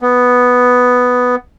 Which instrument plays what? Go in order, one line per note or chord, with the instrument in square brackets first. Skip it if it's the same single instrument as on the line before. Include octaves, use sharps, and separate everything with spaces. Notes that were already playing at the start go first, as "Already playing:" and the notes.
[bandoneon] B3